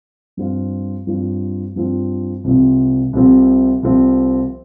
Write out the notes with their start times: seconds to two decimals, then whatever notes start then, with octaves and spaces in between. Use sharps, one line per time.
0.37 G2 F3 C4 F4
1.07 G2 F3 C4 F4
1.76 G2 F3 C4 F4
2.44 C2 C3 F3 C4
3.13 C2 C3 F3 C4
3.83 C2 C3 F3 C4